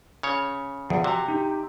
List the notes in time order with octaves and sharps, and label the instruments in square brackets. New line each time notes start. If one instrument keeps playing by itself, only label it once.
[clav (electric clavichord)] C#3 C#5
[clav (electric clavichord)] E2 [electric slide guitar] F3 G#4
[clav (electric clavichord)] C3 [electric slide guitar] F#4 A5 A#5
[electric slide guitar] D#4 G4